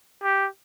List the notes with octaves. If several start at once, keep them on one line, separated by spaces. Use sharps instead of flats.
G4